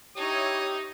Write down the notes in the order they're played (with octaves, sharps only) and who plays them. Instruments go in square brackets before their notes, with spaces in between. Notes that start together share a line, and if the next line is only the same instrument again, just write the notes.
[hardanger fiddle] D#4 [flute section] E4 C#5 [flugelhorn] G4 [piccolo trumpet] D#6